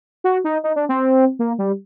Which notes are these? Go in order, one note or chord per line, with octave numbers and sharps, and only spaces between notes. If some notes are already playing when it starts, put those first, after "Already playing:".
F#4
D#4
D#4
D4
C4
A#3
G3